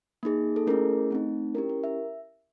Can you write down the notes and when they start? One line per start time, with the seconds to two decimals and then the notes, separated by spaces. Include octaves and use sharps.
0.23 A#3 D#4 G#4
0.56 A4
0.67 A3 C#4 E4 G#4 A#4
1.11 A3 C4 D#4
1.55 C#4 E4 G4 A#4
1.69 A#4
1.84 E5